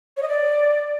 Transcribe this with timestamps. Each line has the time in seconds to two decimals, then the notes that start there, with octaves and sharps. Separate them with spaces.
0.17 C#5
0.22 D#5
0.28 D5